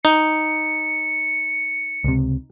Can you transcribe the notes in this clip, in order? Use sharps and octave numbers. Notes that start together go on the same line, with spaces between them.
D#4 C#7
C#2 C3